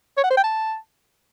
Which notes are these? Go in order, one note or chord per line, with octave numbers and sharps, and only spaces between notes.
C#5
F#5
C5
G5
A5